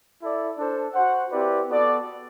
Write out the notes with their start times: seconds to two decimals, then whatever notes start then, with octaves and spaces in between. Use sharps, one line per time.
0.21 E4 A4 D5
0.57 D4 A4 C5
0.95 F#4 C5 F#5
1.31 C4 E4 G4 B4 D5
1.68 B3 F#4 A4 D5